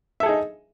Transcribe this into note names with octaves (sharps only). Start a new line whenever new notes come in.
D#4 G#4 A4 E5